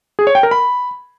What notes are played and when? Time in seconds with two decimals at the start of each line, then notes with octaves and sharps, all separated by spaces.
0.19 G#4
0.27 C#5
0.35 G5
0.43 A#4
0.51 B5